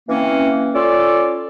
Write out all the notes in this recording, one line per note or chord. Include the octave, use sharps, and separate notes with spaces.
E3 A#3 C4 C#4
C#4 F4 A4 D5